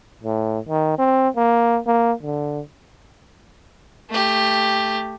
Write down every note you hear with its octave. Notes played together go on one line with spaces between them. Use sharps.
A2
D#3
C4
A#3
A#3
D3
A3 G4